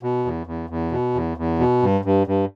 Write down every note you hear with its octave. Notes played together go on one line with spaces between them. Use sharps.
B2
E2
E2
E2
B2
E2
E2
B2
G2
G2
G2